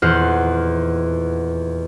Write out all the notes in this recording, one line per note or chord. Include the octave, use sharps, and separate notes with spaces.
D#1 E2 C5 F#5 F6